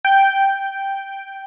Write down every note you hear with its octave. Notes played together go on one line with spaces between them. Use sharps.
G5